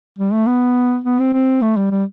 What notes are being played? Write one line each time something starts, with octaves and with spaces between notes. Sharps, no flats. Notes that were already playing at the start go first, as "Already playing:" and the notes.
G3
A3
B3
B3
C4
C4
A3
G3
G3